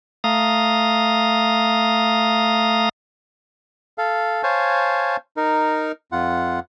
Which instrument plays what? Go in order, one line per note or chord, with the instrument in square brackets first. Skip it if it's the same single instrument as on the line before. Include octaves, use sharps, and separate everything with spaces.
[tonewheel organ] A3 F5 A#5 D#6
[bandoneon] A4 F5
C5 C#5 F5 G#5 A5
D#4 A#4
F2 F4 F#5